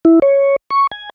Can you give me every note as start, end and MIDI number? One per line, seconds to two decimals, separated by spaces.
0.05 0.19 64
0.22 0.56 73
0.70 0.87 85
0.92 1.10 80